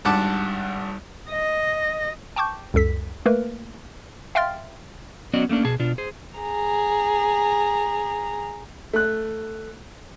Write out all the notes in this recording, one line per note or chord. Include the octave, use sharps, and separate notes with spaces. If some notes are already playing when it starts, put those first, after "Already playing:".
G#1 G2 F#5 A5 D6
D#5
G5 A5 C#6 D6 G6
C#2 F#2 A4 B6
A3 A#3 A#4 B4
E5 F5 G5 C6 F6 A6
F#3 B3 C#4 F#4 D5 D#5
A3 A#3 C#4 D4
B2 G#4 A5
B2 D4 F4
G#4 C5
G#4 A#5
A3 F#6